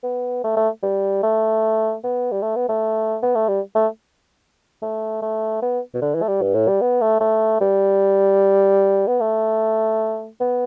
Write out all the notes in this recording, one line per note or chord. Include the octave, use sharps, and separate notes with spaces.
B3
A3
A3
G3
A3
B3
G3
A3
B3
A3
B3
A3
G3
A3
A3
A3
B3
B2
D3
E3
A3
G3
G2
A2
G3
B3
A3
A3
G3
B3
A3
B3